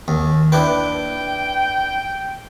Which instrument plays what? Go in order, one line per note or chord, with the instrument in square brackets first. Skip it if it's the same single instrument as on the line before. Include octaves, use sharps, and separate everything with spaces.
[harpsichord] D#2
[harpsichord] D4 E4 B4 [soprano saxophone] G5